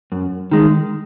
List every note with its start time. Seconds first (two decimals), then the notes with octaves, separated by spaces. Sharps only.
0.12 F#2
0.51 D#3 G#3